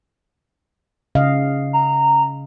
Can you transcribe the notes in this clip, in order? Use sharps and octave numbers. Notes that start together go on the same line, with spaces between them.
C#3 D#5 F5
A#5